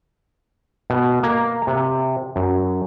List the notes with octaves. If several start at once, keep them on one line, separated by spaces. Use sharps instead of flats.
B2
A#3
C3
F#2